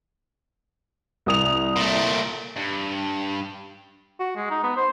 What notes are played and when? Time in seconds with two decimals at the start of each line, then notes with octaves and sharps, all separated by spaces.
1.26 C2 D#6 F7
1.76 A#2 A3
2.56 G2
4.20 F#4
4.36 G#3
4.51 D#4
4.64 B3
4.77 C5